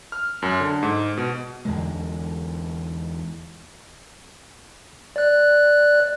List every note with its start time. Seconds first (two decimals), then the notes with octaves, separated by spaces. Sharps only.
0.12 F6
0.42 F#2
0.60 D3
0.83 G#2
1.17 B2
1.65 E2 D3 G#3
5.16 D5 F#6